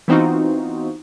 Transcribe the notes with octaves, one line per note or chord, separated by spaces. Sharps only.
E3 B3 C4 D#4 F4 F#4